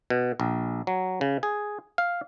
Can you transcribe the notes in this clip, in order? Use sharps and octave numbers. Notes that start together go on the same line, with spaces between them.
B2
A#1
F#3
C#3
G#4
F5